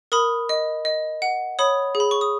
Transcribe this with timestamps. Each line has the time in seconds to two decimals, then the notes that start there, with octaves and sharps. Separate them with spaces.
0.12 A#4 B5 D#6
0.49 D#5
0.85 D#5
1.22 F#5
1.59 C#5 B5 D#6
1.95 G#4
2.00 B5
2.11 C#6
2.21 D#6